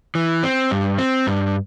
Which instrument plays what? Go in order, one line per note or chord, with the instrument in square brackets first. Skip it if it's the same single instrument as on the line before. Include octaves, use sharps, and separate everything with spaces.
[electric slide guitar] E3
C4
G2
C4
G2